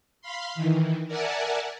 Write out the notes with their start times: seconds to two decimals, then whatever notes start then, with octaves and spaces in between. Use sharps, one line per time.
0.22 F5 B5 C6
0.55 D#3 E3
1.07 A#4 D5 E5 F#5 G#5 A5